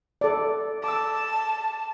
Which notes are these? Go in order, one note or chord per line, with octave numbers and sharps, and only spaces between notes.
A4 D5
A5 D6 E6